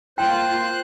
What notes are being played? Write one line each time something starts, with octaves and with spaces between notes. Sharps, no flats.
A#3 F4 C5 G5 F#6